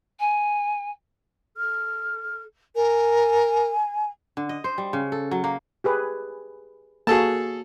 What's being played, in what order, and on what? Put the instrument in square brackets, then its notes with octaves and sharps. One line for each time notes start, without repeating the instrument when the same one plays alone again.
[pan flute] G#5
[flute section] A4 F6
[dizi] A#4 [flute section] G#5
[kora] D3
D#5
C5
G3
C#3
A4
F#3
A#3
[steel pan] G4 G#4 B4
[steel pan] A#3 F#4 [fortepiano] G#4 A4 A5